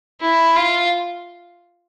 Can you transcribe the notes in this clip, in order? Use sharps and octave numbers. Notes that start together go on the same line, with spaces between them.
E4
F4